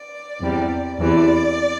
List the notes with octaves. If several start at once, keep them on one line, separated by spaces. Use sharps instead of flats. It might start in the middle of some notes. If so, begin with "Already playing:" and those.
Already playing: D5
E2 C3 G3
E2 C3 E3 D5